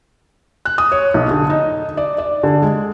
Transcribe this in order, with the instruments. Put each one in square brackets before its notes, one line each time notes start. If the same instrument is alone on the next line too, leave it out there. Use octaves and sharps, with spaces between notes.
[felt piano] F#6
D#6
C#5
B1
D3
D#4
D5
D5
D3
G#3